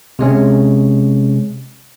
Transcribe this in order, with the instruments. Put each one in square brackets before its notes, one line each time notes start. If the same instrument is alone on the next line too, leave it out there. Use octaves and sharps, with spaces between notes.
[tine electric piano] C3 G#3 C#4